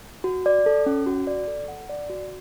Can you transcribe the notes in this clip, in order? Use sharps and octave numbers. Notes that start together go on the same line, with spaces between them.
F#4
D5
A4
C#4
F#4
D5
A4
F#5
D5
F#4